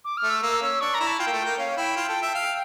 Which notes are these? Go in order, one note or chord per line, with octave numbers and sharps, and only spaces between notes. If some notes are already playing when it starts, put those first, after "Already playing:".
D6
F6
A3
E6
A#3 E6
C#4
D4 C#6
A#5
E4
A5
F4 G5
A#3
A3
A#3
C#4 F5
E4 G5
F4
A4
E5
F5